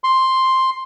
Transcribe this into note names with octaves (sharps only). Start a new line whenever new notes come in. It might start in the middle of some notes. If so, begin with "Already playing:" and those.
C6